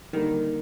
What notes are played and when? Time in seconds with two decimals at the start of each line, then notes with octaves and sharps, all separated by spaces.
0.13 D3 D#3 G3 A#3